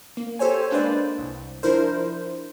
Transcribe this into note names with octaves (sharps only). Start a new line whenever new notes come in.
A#3
G4 A4 C5 C#5 G#5
G#3 A#3 D4 B4 C5 D5
C2
F3 D4 E4 A#4 C5